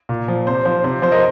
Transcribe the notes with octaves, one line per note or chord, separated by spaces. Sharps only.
A#2
F3
C3 C5
F3 C5
C3 C5
F3 C5
A#4 D#5